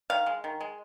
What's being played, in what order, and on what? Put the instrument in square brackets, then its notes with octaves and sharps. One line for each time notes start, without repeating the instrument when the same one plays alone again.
[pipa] D#3 F5
G#3
D#3
G#3